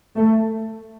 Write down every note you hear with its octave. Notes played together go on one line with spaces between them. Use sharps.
A3